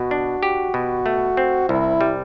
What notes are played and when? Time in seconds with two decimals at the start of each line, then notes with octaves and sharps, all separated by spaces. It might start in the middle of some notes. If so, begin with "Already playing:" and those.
Already playing: B2 F#4
0.11 D4
0.43 G4
0.74 B2
1.06 A3
1.37 C4
1.69 C2 E4
2.01 G3